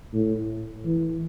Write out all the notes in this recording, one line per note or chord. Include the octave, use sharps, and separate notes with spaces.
A2
E3